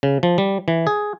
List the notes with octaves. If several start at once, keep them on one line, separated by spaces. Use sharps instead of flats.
C#3
F3
G3
E3
G#4